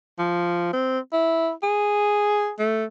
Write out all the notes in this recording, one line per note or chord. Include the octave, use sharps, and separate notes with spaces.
F3
C4
E4
G#4
A3